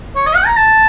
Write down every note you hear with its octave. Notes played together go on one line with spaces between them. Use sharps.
C#5
D#5
F#5
A#5
A5